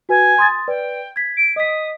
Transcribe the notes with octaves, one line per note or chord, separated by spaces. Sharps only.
F#4 B4 G#5
C6 D#6 A6
B4 D5 G5
G#6 B6
D7
D#5 D#6 B6